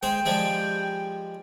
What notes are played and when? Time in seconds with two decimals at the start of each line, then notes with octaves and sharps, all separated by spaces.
0.03 G#3 C5 G5
0.26 F3 G3 G#3